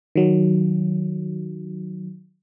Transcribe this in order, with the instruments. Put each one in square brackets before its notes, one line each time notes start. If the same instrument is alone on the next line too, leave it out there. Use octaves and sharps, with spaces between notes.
[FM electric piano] D#3 F#3